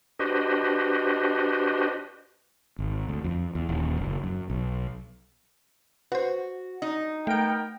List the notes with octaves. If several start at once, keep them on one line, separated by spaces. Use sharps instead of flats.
D4 F#4 G4 B4 C5 D#5
G#1
D2
F2
E2
D#1
F#1
F#2
B1
F#4 B4 C5
D#4
A3 B3 A#4 G5 D7